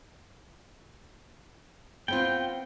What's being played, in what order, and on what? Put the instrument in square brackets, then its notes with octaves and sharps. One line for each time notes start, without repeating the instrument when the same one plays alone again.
[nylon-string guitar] B3 C4 F4 [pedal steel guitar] G5